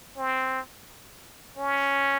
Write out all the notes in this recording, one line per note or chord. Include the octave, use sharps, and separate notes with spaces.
C4
C#4